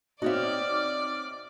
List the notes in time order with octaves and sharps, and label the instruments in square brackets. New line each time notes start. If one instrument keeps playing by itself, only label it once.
[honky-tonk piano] C4 D#4 [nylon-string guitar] F#4 C#5 E5 [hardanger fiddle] D5 [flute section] D6 F6